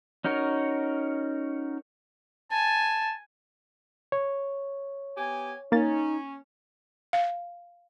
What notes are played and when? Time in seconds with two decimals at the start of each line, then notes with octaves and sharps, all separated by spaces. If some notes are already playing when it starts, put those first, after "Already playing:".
0.24 C#4 D#4 F#4 A#4 C#5
2.52 G#5 A5
4.12 C#5
5.17 B3 G4 G#5
5.72 A#3 C#4 D#4 A6
7.13 F5